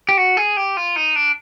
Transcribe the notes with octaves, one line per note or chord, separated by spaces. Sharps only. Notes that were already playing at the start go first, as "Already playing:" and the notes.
G4
F#4
G#4
G4
F4
D#4
D4